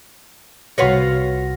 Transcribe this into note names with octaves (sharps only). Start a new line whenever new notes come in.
C2 F4 F#4 B4 C#5 A#6